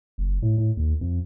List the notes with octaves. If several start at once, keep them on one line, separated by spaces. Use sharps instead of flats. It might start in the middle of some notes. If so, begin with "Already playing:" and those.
F#1
A2
A2
D#2
F2